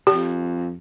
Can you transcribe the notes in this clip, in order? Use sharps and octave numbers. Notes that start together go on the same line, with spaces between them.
F2 G4